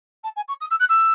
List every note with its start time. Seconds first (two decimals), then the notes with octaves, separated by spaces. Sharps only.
0.24 A5
0.36 G#5
0.48 C#6
0.61 D#6
0.71 E6
0.80 F#6
0.89 E6